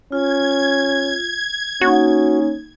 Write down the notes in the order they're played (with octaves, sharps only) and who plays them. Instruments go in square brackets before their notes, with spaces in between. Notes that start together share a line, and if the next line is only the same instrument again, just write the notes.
[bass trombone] C#4 [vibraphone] F4 [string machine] G#6
[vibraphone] A#3 D#4 [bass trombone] C#4 [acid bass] F#4